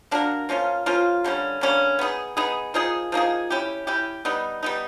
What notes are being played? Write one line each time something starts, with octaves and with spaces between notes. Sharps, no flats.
A#3 D4 F#4 A#4
F3 A#3 C#4 F4
F3 A#3 C#4 F4
D3 G3 A#3 C#4
D3 G3 A#3 C#4
B3 D#4 G#4
B3 D#4 G#4
F3 A#3 D#4 G#4
F3 A#3 D#4 G#4
C#4 E4 G4
C#4 E4 G4
G3 B3 D#4
G3 B3 D#4